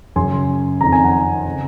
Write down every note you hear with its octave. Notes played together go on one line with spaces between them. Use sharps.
F#2 C#3 G#5 C6
F2 D#3 A#5
G#5
F#5 A#5
C#3